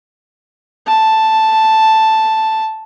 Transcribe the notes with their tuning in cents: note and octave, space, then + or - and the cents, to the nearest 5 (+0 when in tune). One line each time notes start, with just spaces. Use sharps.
A5 +0